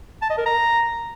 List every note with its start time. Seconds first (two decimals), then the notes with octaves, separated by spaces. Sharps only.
0.22 A5
0.30 D#5
0.38 A#4
0.46 A#5